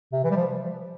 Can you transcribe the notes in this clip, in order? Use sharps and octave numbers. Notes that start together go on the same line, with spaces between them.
C3
E3
G3
F3